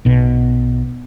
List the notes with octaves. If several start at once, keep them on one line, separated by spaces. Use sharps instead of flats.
B1 B2